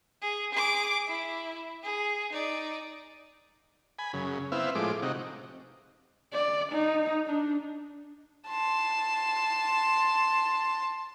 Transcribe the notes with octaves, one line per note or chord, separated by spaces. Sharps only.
G#4
G#4 D6
E4
G#4
D#4 D5
G#5 B5
F#2 C#3
B3 C4 E4 E5 F5
A2 F3 G#3 D6
C3 D#4 F#4
D5
D#4
D4
A5 C6